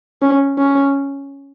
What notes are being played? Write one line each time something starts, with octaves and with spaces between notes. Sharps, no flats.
C#4
C#4